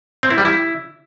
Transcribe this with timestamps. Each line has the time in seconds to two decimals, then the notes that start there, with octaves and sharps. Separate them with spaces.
0.23 C4
0.30 E4
0.38 G3
0.45 E4